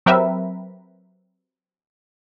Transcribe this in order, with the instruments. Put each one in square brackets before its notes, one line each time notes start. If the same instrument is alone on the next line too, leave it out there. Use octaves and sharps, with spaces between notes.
[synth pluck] F#3 C4 G4 A#4 B4 E5